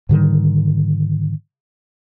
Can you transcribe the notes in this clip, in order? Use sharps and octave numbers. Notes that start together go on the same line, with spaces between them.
G#2 D3 D#3 G3